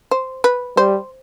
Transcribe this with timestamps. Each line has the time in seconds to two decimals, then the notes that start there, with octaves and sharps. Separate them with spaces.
0.11 C5
0.44 B4
0.77 G3 C5